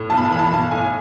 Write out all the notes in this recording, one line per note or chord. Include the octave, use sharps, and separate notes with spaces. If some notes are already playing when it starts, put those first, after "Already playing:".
Already playing: A2
B1 A5
B5
A5
E3 B5
A5
B5
B1 A5
A2 G#5